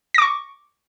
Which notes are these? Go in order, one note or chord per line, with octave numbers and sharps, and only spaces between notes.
C#6 D6 A#6